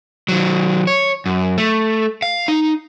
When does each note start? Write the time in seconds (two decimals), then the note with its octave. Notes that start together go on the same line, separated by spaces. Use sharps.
0.28 D#3 F#3
0.87 C#5
1.26 F#2
1.58 A3
2.22 F5
2.48 D#4